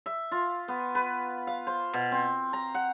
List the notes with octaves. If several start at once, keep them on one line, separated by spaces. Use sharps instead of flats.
E5
F4
B3
B4
F5
C5
B2
C4
A#5
F#5